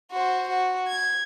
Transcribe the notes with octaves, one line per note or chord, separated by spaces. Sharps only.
F#4 C5
F#4
G#6